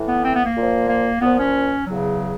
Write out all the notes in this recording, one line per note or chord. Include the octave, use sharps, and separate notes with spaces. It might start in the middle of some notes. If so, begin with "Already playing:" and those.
Already playing: A2 E3
B3
C4
B3
A#3
A#2 F3
A#3
A#2 F3 B3
C#4
E2 C#3 F#3